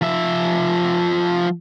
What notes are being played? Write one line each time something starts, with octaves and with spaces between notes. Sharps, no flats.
F3 E5